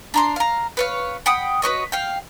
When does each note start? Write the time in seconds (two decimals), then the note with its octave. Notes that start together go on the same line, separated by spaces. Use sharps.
0.14 D4 A#5 C6
0.36 F5 A#5
0.77 B4 C#5 F5
1.26 F#5 G5 B5 D#6
1.62 F#4 B4 C#5 D#5
1.92 F5 G5